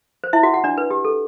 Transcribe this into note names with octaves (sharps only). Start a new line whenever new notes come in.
C5
E4 E5
F#4 F#5
F#4 F#5
D4 D5
B4
G4
A4